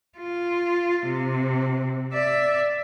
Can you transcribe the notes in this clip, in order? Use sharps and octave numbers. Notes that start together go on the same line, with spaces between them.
F4
C3
D5 E5